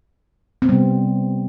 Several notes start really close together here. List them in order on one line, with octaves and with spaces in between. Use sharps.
C4 B3 G3 C3